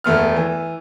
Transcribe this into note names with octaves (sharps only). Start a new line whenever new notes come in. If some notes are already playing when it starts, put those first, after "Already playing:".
E1 A3 B3 F6
E3